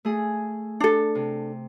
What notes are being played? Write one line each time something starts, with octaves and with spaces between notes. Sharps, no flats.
A3 G#4
D4 A4
C3